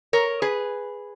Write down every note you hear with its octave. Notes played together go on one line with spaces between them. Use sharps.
A#4 C#5
G#4 B4